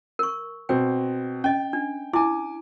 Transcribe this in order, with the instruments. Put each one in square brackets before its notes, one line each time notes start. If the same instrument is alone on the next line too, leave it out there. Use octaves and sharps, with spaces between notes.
[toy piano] A#4 C#6
[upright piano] B2 C4 [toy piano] G5
[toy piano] C#4 D#5 [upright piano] G5
[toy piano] D4
[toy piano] E4 [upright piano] G#5 D6